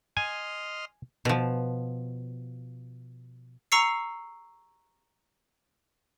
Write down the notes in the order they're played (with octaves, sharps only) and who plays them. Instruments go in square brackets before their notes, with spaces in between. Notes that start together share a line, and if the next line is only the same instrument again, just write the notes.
[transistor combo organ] D#5 C6 F6 [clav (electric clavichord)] G#5
[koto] B2 F3
[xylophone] A#5 C#6 E6 C7 C#7